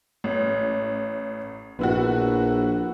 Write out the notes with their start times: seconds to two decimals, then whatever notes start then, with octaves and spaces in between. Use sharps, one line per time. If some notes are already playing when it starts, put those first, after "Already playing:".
0.24 A1
1.79 A#1 B3 E4 F#4